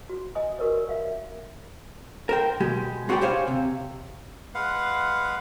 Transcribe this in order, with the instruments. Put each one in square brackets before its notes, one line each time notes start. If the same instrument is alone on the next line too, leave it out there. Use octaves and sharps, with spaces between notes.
[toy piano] F#4
D#5 G#5 D#6
F#4 G4 A#4 B4 C#5 D5
E5 F5
[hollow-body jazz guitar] A#4 C5 G5
B2 G#3 G4
F4 F#4 G#4 B4 D5 G5
G4 C5 C#5 F5 G#5
C3
[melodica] G#3 B4 F5 F#5